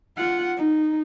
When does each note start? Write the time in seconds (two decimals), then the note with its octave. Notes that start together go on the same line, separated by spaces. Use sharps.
0.17 F4 F#5
0.57 D#4